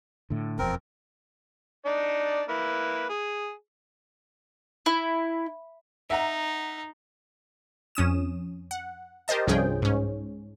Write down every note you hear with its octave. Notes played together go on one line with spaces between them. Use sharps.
A2 D3
E1 F2 C4 A#4
D4 D#4 D5
A#3 E4 B4
G#4
E4
D#4 E5 F#5 A#5
F2 C#4 D#6 E7
F#5
G4 A#4 C5 D#5 A5
C2 G2 F3 C#4 G#4 G5
G#2 C#4